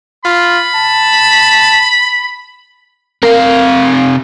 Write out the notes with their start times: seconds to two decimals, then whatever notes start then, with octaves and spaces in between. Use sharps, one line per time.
0.25 F4 B5
0.75 A5
3.23 C3 A#4 F5